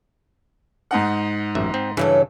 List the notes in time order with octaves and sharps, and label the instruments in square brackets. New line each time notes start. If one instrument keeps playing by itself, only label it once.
[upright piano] G#2 D#4 F#5
[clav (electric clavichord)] A1 F#2 E5
C4
[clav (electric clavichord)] G2 E3 [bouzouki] C#3 F#3 A4